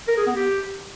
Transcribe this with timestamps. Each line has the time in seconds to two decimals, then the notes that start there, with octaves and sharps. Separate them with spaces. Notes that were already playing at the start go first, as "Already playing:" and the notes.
0.08 A#4
0.17 G#4
0.27 B3
0.36 G4